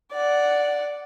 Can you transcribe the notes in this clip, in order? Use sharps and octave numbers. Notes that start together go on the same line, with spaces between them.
D5 F#5